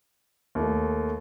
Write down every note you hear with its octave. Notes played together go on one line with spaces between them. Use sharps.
D#2 A3